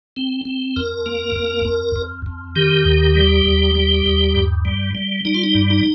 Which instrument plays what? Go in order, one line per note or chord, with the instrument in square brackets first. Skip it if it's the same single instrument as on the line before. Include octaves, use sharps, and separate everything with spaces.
[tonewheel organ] C4
C4
F2 A#4
A#3
F2
F2
F2
F2
D#3 G4
D#2
G3
D#2
G3
D#2
G2
G3
G3
G3 D#4
F4
D#4
G2
D#4